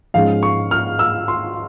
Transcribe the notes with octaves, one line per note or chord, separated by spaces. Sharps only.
G#2 F3 G#3 C#4 F4 F5
C#6
F6
E6
C6